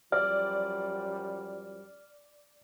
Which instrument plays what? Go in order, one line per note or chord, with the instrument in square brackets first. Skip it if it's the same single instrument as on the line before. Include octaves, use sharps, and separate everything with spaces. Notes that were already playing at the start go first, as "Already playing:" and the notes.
[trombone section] F#2 F3 G3 [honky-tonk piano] D5 [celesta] F6